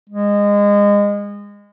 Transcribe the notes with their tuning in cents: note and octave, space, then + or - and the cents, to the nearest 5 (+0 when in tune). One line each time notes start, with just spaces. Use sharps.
G#3 -25